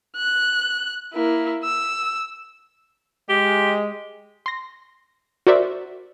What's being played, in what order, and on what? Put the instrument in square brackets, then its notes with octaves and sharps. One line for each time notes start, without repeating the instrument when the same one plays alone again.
[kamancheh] F#6
A#3 E4
E6
[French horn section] G#3 [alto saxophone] G4
[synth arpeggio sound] C6 A#6
F#4 A#4 C5 D5 E5